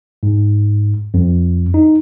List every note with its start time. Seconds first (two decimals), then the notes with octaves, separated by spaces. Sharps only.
0.23 G#2
1.14 F2
1.74 D#4